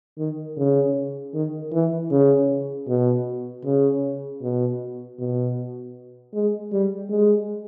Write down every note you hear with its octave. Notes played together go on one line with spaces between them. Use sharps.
D#3
C#3
D#3
E3
C#3
B2
C#3
B2
B2
G#3
G3
G#3